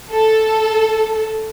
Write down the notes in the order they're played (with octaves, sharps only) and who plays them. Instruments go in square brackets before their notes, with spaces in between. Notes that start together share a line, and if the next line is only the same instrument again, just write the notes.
[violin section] A4